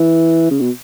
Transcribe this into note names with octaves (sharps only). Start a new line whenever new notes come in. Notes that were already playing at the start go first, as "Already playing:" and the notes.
Already playing: E3
C#3
B2